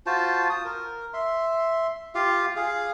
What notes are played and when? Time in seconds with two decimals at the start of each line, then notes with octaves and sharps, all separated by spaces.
0.06 F4 F#4 C5 A5
0.50 D#6
0.65 A#4
1.14 E5 C6
2.15 F4 G4 F5
2.56 G#4 F5